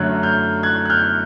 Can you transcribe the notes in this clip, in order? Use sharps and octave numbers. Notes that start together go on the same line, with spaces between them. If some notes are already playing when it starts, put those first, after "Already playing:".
Already playing: F#2 D3 F#3 A3 F#6 G#6
F6 G6
F#6 G#6
F#6
F6 G6